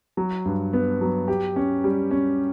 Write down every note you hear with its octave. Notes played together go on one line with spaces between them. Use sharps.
F#3
G2
B3
F#3
G4
C#4
G3
C#4